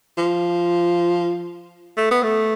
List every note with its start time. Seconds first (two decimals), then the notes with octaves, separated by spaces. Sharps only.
0.18 F3
1.97 A3
2.11 B3
2.23 A3